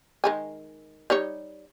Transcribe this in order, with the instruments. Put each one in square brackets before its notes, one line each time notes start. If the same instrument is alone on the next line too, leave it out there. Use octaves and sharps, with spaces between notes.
[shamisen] D#3 G#3 G#5
G3 D#4 C#5